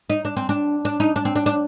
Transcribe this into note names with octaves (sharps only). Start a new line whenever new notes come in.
D#4
D4
C4
D4
D4
D#4
D4
C4
D4
D4